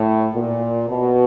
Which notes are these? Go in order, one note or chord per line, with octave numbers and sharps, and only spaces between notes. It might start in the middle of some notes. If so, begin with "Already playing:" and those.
Already playing: A2
A#2
B2